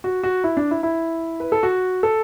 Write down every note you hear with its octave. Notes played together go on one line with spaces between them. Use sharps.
F#4
F#4
E4
D4
E4
E4
B4
A4
F#4
A4